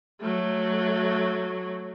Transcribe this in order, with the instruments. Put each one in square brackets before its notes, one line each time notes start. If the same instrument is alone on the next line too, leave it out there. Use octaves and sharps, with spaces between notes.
[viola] F#3 A3